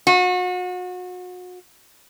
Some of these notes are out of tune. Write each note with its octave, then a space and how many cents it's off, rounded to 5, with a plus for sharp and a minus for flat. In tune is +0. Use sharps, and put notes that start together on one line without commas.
F#4 -35